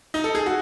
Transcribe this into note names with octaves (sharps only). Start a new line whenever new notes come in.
D#4
A4
G#4
F#4